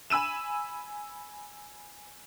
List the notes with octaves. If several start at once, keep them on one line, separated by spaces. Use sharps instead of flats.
G#5 B5 E6 D#7 E7